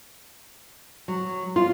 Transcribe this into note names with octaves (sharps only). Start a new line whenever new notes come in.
F#3
F4